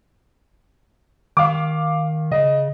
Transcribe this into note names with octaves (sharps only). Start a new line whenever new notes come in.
D#3 F5 D6
C#3 D#5